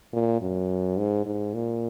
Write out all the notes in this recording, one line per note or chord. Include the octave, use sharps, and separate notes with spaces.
A#2
F#2
G#2
G#2
A#2